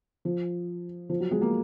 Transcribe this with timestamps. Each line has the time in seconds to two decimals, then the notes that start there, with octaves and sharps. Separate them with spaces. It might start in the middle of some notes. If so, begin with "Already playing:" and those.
0.25 F3
1.09 F3
1.20 F#3
1.31 G#3
1.41 A#3